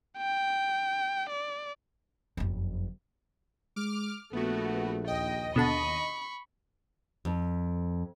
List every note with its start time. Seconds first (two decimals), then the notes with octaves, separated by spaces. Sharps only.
0.18 G5
1.30 D5
2.37 F#1 F2
3.76 G#3 D6 F6
4.33 A#1 A3 B3 F#4
5.08 D#2 D#5 G5
5.56 B2 D3 A5 B5 C#6
7.25 F2